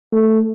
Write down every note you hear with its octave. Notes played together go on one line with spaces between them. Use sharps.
A3